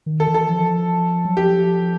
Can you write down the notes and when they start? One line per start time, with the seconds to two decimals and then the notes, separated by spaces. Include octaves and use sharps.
0.06 D#3
0.20 A4
0.27 E3
0.34 A4
0.49 F3
1.25 F#3
1.37 F3 G4